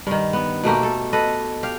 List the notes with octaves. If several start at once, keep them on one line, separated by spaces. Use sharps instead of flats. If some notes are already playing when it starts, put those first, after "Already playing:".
G2 D#3
B3
B2 A3 A#3 G4
A4
A4 B4 D#5
G4 F5